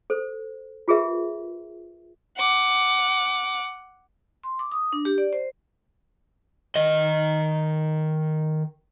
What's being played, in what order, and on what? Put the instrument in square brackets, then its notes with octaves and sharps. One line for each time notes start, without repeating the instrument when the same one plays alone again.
[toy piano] A4 C5
F4 G4 G#4 A#4 B4 E5
[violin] F#5 D6
[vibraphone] C6
D6
D#6
D4
G4
D5
C5
[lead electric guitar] D#3 D#5